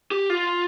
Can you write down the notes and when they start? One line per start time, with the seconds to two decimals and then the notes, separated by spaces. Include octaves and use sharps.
0.11 G4
0.30 F4